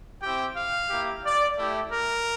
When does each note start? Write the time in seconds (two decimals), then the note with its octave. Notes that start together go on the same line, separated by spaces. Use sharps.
0.22 C4 E4 G4 G5
0.56 F5
0.90 A#3 E4 G4
1.24 D5
1.57 A3 E4 G4
1.92 A#4